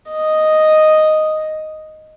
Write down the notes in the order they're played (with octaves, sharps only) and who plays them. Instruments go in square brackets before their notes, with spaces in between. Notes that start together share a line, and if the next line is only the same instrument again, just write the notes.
[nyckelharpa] D#5